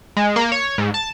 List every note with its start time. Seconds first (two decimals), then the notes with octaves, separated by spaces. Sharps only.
0.17 G#3
0.36 A#3
0.52 C#5
0.78 G#2
0.94 A5